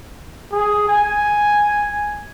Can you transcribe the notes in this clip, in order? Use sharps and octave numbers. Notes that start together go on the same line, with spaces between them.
G#4
G#5